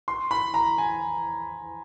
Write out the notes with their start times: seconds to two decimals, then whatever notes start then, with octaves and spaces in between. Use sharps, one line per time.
0.08 C6
0.31 B5
0.54 A#5
0.78 G#5